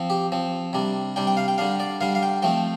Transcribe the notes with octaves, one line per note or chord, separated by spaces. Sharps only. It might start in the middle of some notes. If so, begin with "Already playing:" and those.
Already playing: F3 C4
G4
F3 C4
C3 G3 D4
C3 G3 D4 G5
G5
F5
G5
D3 G3 D4 F5
D5
D3 G3 D4 F5
F5
G5
F3 A3 C4 G5